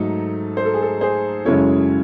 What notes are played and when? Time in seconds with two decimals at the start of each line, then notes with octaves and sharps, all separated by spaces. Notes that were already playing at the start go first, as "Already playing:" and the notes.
Already playing: G#2 F#3 A3 D#4 A4
0.57 C5
0.65 A4
0.74 G#4
0.82 A4
1.01 G#4 C5
1.45 F#2 C#3 G#3 C#4 E4 A4 C#5